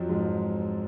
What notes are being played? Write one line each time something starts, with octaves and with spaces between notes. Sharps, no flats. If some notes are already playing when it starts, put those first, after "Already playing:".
Already playing: F2 F3 F#3
G#2 G#3